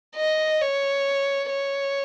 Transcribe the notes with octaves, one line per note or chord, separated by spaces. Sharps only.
D#5
C#5
C#5